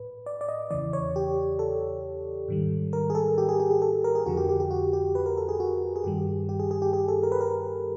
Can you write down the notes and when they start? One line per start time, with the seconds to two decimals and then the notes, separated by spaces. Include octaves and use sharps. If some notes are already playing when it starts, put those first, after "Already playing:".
Already playing: A2 B4
0.26 D5
0.41 D5
0.49 D#5
0.71 E2 C#3 E3 D5
0.93 C#5
1.16 G4
1.59 A4
2.48 G#2 D#3 G3
2.93 A#4
3.10 G#4
3.15 A4
3.38 G4
3.49 G#4
3.60 G4
3.71 G#4
3.82 A4
4.04 A#4
4.15 G#4
4.26 F2 D3 F3 F#4
4.37 G4
4.49 G4
4.60 G4
4.71 F#4
4.93 G4
5.15 B4
5.26 A#4
5.37 A4
5.49 G#4
5.60 F#4
5.96 G#4
6.04 G2 D#3 G3 G4
6.49 G4
6.60 G#4
6.71 G#4
6.82 G4
6.93 G#4
7.08 A4
7.23 A#4
7.32 B4
7.41 A#4